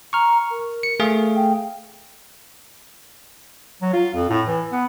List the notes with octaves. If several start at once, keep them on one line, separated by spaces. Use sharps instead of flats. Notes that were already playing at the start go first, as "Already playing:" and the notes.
A#5 C#6 F6
A#4
C#7
A3 G#4 F5
G5
F#3
F4
F2
A2
E3
B3